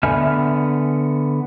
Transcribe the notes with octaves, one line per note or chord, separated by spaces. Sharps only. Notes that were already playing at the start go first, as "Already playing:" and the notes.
D3 B3 E5 G#5 F6